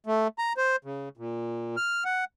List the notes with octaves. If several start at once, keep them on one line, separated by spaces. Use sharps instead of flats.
A3
A#5
C5
C#3
A#2
F6
F#5